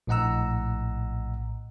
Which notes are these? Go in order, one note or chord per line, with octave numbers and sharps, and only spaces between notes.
A#1 A2 D#5 F#5 A#5 E6